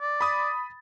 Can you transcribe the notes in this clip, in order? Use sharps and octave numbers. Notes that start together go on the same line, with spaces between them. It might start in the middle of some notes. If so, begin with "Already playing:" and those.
D5
B5 D#6 A6